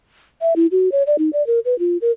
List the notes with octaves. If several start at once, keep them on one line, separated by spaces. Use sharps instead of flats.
E5
E4
F#4
C#5
D5
D#4
D5
A#4
B4
F4
A#4